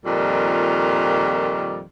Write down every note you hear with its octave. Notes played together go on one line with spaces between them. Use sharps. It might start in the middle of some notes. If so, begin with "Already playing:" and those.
F2 A#2 D#3 G3